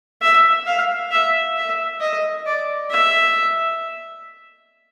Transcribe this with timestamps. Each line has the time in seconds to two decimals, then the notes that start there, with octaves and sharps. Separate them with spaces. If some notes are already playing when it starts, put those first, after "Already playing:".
0.22 E5
0.67 F5
1.11 E5
1.57 E5
2.01 D#5
2.46 D5
2.91 E5